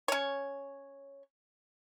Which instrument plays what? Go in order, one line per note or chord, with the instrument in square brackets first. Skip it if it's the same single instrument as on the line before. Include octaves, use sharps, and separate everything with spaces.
[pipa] C#4 C#5